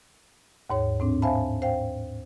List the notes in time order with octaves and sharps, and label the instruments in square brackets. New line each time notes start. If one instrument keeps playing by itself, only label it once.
[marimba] D#2 G#2 C#5
A2 C4 D4
C5 E5 F5 G#5 A5 B5
C5 F5 G5